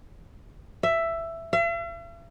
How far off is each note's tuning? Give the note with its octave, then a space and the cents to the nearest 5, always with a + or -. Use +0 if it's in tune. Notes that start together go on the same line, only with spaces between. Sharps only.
E5 +10
E5 +45